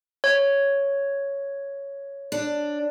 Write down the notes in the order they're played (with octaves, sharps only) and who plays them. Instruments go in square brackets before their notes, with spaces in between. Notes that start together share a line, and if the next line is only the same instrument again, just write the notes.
[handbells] C#5
[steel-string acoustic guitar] D4